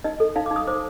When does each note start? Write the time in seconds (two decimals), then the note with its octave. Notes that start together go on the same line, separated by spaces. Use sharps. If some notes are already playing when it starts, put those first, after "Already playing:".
0.04 D#4 D#5
0.20 A4
0.36 D#4 F5
0.46 D6
0.51 D#4
0.56 D#6
0.67 C5 D6